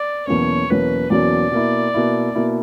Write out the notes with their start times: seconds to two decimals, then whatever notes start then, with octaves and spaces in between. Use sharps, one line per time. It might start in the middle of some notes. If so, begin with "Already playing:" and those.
Already playing: D5
0.27 E2 B2 F#3 A#3 C#4 C#5
0.70 E2 B2 F#3 A#3 C#4 B4
1.10 E2 B2 F#3 A#3 C#4 D5
1.52 B2 A#3 E4
1.94 B2 A#3 E4
2.35 B2 A#3 E4